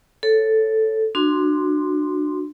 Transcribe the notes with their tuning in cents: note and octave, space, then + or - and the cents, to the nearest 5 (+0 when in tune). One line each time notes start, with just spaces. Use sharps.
A4 +0 C#5 +0
D4 +25 F#4 -10 C6 -5